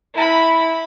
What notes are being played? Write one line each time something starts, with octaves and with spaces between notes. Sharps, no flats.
E4 B5